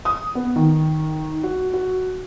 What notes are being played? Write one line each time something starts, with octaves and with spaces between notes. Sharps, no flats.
D#6
B3
D#3
F#4
F#4